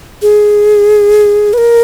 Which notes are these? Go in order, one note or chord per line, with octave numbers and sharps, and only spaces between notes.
G#4
B4
A#4